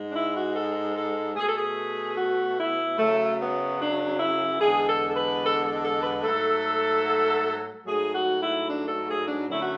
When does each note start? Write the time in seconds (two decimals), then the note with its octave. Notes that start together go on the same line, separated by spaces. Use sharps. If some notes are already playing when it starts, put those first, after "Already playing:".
Already playing: G#2 G#3
0.08 D4
0.13 E4
0.35 F#4
0.55 A4
0.95 A4
1.35 B2 A3 G#4
1.46 A4
1.56 G#4
2.16 F#4
2.57 E4
2.98 F#2 C#3 F#3 A3
3.39 B3
3.79 D4
4.19 E4
4.60 E2 D3 G#3 G#4
4.87 A4
5.10 A4
5.15 B4
5.42 A4
5.63 A4
5.82 A4
6.02 B4
6.23 G#2 F#3 A3 A4
7.85 G#2 F#3 A3 G#4
8.12 F#4
8.40 E4
8.67 D4
8.87 A4
9.07 G#4
9.27 D4
9.47 F#2 D3 F#3 A3 E4
9.59 F#4